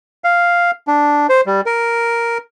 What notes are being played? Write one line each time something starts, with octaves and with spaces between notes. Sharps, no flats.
F5
D4
C5
G3
A#4